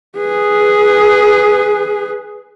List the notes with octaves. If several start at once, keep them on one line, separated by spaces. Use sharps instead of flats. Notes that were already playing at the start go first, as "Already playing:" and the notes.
G#4 B4